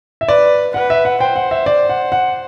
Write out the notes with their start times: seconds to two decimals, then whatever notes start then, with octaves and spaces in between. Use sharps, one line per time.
0.21 E5
0.28 B4 D5
0.74 B4 F#5
0.90 E5
1.05 F#5
1.20 C5 G5
1.36 F#5
1.51 E5
1.66 D5
1.89 F#5
2.12 F#5